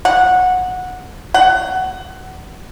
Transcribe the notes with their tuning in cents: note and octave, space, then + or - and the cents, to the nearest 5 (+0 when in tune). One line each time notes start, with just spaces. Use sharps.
F#5 -15
F#5 +20